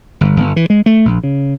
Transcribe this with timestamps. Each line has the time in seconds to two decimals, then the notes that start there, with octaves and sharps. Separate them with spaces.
0.21 G1
0.36 G1
0.56 E3
0.70 G#3
0.86 A3
1.05 A#1
1.23 C#3